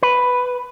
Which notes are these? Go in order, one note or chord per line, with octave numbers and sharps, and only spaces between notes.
B4